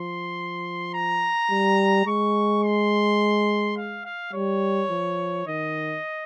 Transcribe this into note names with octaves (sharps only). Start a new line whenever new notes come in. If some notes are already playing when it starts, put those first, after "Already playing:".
Already playing: F3 C6
A#5
G3
G#3 C#6
C6
F5
F5
G3 C#5
F3
D#3 D#5